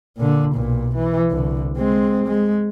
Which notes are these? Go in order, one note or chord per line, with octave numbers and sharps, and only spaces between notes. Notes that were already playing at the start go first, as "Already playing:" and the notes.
A#2 D3
B1 A#2
E3
C2 D3
G#3 C4
G#3